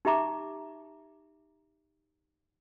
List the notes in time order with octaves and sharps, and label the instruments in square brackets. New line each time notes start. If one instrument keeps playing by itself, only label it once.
[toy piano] D#4 G4 E5 A#5 D6